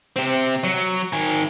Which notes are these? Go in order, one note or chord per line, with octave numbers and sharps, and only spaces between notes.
C3 C4
F#3
D#3 G#5